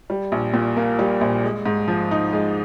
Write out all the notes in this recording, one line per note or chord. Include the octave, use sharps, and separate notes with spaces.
G3
A#1
A#2
A#3
G3
A#1
G#3
G#2
F3
D#4
G#3